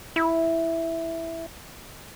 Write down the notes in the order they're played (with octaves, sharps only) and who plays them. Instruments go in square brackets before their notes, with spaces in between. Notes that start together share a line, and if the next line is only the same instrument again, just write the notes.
[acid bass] E4